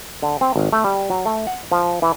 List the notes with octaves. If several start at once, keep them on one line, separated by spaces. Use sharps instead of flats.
D3
C4
G#1
A3
G3
F#3
A3
F#5
F3
E3